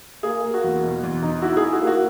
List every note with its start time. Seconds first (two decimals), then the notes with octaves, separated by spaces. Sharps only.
0.23 A#3 G#4
0.44 A#3
0.54 F#4
0.64 E2
0.83 B2
1.03 E2
1.23 D#4
1.42 E4 F#4
1.57 G#4
1.63 E4
1.73 F#4
1.82 A#3
1.87 F#4